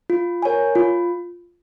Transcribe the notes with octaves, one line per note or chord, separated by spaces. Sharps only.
F4
A#4 C#5 G#5
F4